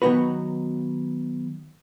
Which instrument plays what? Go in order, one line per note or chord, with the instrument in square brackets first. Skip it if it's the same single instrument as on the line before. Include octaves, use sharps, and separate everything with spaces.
[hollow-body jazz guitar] D#3 F#3 B3 D#4 F#4 B4